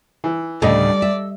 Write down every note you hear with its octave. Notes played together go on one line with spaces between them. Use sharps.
E3
D2 A2 C#3 G3 A4 D5 D#5
E5